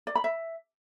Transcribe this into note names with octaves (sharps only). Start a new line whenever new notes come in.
D5
B5
E5